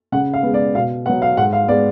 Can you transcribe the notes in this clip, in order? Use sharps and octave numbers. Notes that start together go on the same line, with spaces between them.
C#3 F#5
F5
G#3 B3
D5
B2 F5
F#3 B3 F#5
F5
G#2 F#5
F5
G#3 B3 D5